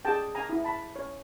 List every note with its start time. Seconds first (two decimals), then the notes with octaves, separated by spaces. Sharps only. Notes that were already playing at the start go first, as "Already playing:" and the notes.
0.05 G#4 G5 A5
0.35 G#5 A#5
0.49 E4
0.64 A5 B5
0.96 C#5